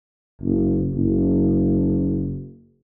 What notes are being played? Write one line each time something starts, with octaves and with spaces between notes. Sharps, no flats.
F#1
F#1